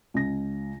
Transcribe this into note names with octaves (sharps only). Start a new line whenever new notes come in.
C#2 A#6